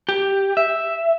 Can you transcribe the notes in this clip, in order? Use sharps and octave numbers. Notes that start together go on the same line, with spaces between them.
G4
E5